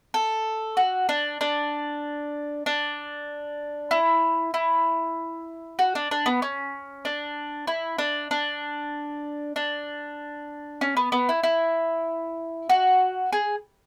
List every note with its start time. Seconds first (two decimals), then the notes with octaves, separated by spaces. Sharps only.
0.14 A4
0.77 F#4
1.09 D4
1.41 D4
2.66 D4
3.91 E4
4.54 E4
5.79 F#4
5.95 D4
6.11 D4
6.26 B3
6.42 C#4
7.05 D4
7.67 E4
7.99 D4
8.31 D4
9.56 D4
10.81 C#4
10.97 B3
11.12 B3
11.29 E4
11.43 E4
12.70 F#4
13.33 G#4